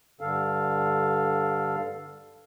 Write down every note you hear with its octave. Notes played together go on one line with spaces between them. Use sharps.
G2 D3 A4 F5